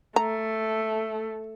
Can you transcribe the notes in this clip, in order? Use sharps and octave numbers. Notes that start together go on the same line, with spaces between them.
A3 A#5